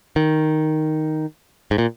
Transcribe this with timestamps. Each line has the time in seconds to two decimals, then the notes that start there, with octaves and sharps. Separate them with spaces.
0.16 D#3
1.71 G#2
1.78 A#2